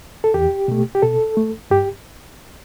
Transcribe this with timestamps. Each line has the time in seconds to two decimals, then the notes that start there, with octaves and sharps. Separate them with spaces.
0.24 A4
0.34 E2 G4
0.68 B2 A3
0.95 G4
1.02 B2 A4
1.37 A3
1.70 G2 G4